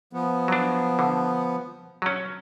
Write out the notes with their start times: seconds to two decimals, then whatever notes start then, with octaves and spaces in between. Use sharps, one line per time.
0.13 F3 B3
0.48 F#3 D4
0.99 D3
2.02 F#3 C#4